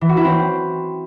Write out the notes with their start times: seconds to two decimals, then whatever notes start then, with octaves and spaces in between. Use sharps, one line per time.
0.01 E3
0.09 F#4
0.17 E4
0.25 C4